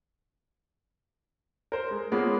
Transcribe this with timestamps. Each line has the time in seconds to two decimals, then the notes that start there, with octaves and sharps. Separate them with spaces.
1.72 A#4 C5
1.91 G#3
2.12 G#3 A#3 B3 C#4 F4